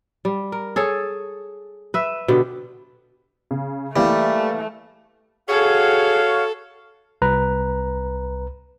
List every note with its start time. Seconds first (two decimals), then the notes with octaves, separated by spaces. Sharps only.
0.25 G3
0.52 A#4
0.76 G#4 A4 C#5
1.94 B4 E5
2.28 B2 D3 G4
3.51 C#3
3.96 E3 G3 A3 A#3
5.48 F#4 G#4 A4 C#5 F5
7.22 C2 B4 A#5